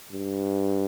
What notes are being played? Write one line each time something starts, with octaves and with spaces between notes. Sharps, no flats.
G2